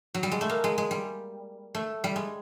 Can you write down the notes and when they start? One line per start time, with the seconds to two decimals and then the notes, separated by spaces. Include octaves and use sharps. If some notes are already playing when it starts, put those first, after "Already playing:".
0.14 F#3
0.23 G3
0.32 G#3
0.41 A3
0.49 A#3
0.64 G#3
0.78 G#3
0.91 G3
1.75 A3
2.04 G3
2.16 G#3